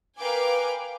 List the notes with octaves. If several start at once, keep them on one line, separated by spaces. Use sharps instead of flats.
A#4 B4 F5 G5 G#5 D6